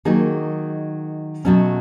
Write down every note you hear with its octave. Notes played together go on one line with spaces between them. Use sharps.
D#3 F#3 A#3 D#4 G#4
B2 F#3 A3 C#4